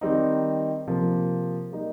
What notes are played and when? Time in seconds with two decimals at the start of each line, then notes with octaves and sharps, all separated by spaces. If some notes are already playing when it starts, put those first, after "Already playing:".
0.01 D#3 G3 C4 D#4
0.87 C3 F3 A#3
1.72 G3 A#3 D#4